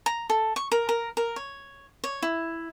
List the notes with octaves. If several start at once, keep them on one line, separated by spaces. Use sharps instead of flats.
A#5
A4
C#6
A#4
A#4
A#4
C#5
C#5
E4